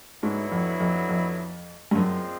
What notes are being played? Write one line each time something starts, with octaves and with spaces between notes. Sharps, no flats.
G#2 D3 F#3 B3 E4
F2
F2
F2
G2
F#2 A#2 F3 G#3 C4